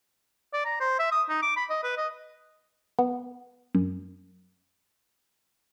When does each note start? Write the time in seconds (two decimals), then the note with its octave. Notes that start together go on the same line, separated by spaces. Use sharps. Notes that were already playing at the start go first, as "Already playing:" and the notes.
0.53 D5
0.65 A#5
0.80 C5
0.99 E5
1.12 D#6
1.29 D#4
1.42 D6
1.56 B5
1.70 D#5
1.83 B4
1.97 D#5
2.99 B3
3.75 F#2